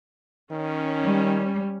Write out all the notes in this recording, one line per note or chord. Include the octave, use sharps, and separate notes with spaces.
D#3 C#4
G3